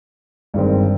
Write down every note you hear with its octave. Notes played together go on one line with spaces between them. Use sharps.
G1 G2 D#3 G#3 C4